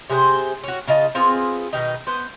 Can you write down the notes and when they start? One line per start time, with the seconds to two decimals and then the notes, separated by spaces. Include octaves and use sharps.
0.10 C3 G#4 A#4 C5
0.64 C#4 F#4
0.88 C#3 F4 D#5 A5
1.15 B3 C4 F4 G#4
1.73 B2 D#3 D#4
2.07 B3 C5